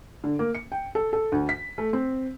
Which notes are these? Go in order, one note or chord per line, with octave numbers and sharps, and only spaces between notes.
D3
A#3
C#7
G5
A4
A4
D2
B6
A3
C4